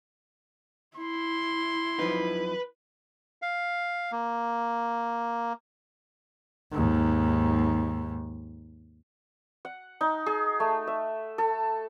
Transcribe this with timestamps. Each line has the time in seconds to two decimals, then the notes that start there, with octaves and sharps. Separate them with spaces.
0.97 E4 C6
1.99 F#2 F3 D#4 B4
3.42 F5
4.12 A#3
6.72 D#2 G#2
9.65 F#5
10.01 D#4
10.26 G#4
10.60 A3
10.87 E5
11.38 A4